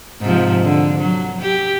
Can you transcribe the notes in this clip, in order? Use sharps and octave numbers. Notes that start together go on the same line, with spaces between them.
G#2 C3 F3
D3
F#3
G4